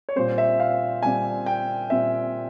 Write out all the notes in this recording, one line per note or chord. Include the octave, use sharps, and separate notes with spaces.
C#5
A#2 G3 C4 C5
E5
F5
A#2 G3 C4 G#5
G5
A#2 G3 C4 E5